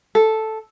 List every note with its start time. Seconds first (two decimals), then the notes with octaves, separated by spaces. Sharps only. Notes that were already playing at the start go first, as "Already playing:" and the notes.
0.15 A4